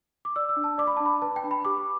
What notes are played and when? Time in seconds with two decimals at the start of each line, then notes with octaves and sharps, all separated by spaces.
0.25 D6
0.36 D5 E6
0.49 E6
0.56 D4
0.64 A5
0.78 D5 D6
0.87 B5
0.97 D4 A5
1.06 B5
1.22 B4 A5
1.36 G5
1.44 D4
1.51 B5
1.65 G4 D6